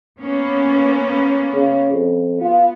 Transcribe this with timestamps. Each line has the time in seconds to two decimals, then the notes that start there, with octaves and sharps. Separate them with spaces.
0.20 A#3 B3 C#4
1.54 C#3
1.92 F2
2.41 B3 F4